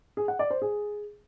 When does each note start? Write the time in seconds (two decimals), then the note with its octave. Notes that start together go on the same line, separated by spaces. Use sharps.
0.17 G#4
0.28 F#5
0.39 D5
0.51 C5
0.62 G#4